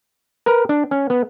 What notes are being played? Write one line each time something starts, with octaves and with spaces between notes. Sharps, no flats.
A#4 B4
D4
C#4
B3